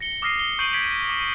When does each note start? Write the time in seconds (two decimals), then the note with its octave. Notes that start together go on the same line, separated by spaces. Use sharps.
0.01 A#6 C#7 G7
0.22 D6 D#6 F6 A#6 C7 D#7
0.39 G7
0.59 C#6 G6 C7 D7 D#7 F#7
0.73 G#6 B6 D7 F#7
1.10 D6